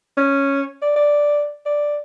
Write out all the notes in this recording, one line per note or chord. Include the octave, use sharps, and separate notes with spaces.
C#4
D5
D5
D5